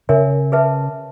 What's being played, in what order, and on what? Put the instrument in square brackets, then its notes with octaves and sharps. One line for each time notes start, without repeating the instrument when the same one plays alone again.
[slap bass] C#3 [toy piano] A#4 C#5 E5 G#5
[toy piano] G#4 B4 E5 A5